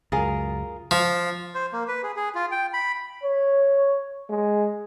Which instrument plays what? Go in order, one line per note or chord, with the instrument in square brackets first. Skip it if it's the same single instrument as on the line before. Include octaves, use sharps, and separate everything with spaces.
[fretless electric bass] C#2 F#2 [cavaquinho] F4 G#4 A#4
[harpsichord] F3
[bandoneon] C5
A#3
B4
G#4
G#4
F4
G5
B5
[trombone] C#5
G#3